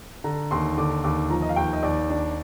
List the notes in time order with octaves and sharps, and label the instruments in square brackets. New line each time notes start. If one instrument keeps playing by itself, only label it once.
[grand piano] D3 A#5
D#2 C6
D3 D6
D#2 D6
F3 A#5
D#5
F5
D#2 G5
D#5
D#2 D5
D4